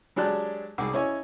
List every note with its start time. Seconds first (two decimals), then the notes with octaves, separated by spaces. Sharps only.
0.16 F#3 G#3 D4 G4 A5 F#6
0.78 C2 G#2 G#4 F#5 D6
0.93 C#4 E4 C#5 D#5 G#5